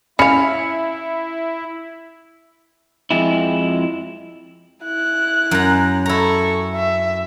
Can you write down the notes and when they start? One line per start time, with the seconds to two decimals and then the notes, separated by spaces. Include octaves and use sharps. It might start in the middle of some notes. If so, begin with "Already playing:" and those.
0.19 C#4 E4 F5 B5 C#7
3.11 F2 G#3 E4
4.85 E4 F#6
5.51 F#2 A#5
6.06 E4 A4 A#5 C#6
6.76 E5